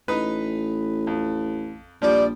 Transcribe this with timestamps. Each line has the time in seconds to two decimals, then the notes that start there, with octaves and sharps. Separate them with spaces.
0.08 A1 D#4 B4
1.07 F2
2.02 A#1 F3 G3 D5